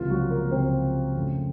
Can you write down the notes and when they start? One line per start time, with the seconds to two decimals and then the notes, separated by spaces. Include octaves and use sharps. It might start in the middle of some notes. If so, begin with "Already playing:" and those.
Already playing: C#2 C3 F3 A#3 F4
0.10 F#3 F#4
0.30 A#3 A#4
0.51 C#2 C3 F3 A#3 C4 C5
1.15 F2 C#3 A3